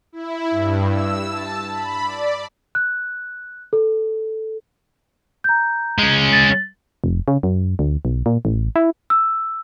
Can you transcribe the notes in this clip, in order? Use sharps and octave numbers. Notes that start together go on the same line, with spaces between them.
E4
G2
E6
A5
B5
D5
F#6
A4
A#5 G6
G#3 C#4
A6
F1
C#3
F#2
D2
B1
A#2
A1
E4
E6